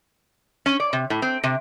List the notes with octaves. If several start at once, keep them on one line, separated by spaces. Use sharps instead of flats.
C#4
D5
C3
A2
C4
C3